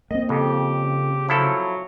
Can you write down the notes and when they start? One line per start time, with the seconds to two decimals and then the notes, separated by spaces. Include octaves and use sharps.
0.11 A#3 C4 D#5
0.29 F2 C#3 G4
1.29 F3 F#3 E4 A4